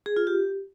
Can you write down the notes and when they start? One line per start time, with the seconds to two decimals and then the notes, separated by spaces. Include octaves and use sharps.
0.06 G#4
0.16 F4
0.27 G4